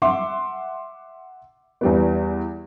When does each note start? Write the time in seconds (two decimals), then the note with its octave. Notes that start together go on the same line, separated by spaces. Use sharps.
0.02 E5 F#5 C6 D6
1.81 E2 G3 B3